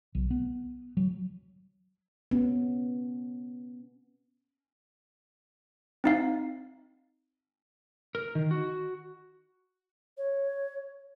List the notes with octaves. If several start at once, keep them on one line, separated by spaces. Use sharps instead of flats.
B1
B3
F#3
B3 C#4
C4 D#4 F5
A#4
D#3
F#4
C#5